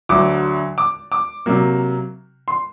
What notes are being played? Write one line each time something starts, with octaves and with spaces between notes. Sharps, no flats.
D2 D3 F#3 D6
D6
D6
C3 F#3 A#3
C6